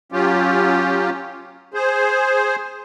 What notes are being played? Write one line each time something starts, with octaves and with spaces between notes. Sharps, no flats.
F#3 C#4 F4 G4
G#4 C5